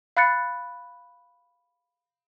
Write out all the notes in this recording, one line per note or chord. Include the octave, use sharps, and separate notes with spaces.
F5 B5 F#6 A6 C#7